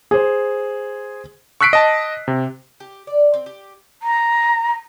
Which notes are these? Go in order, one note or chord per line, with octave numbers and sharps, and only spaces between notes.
G#4 C5
C#6 E6 F#6 B6 C7 D7
D#5 A5
C3
G4
D5
C4
G4
A#5